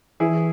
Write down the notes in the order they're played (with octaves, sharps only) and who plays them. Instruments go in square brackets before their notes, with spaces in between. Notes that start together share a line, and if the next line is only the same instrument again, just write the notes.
[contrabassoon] E3 [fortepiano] E4 G#4